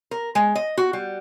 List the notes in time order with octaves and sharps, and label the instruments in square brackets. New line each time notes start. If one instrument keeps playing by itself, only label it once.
[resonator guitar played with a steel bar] A#4
G#3
D#5
F#4
G3